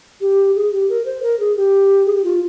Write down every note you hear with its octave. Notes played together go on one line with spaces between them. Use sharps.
G4
G#4
G4
A#4
C5
A#4
G#4
G4
G#4
G4
F4